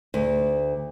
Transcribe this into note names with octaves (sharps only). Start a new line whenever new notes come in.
D2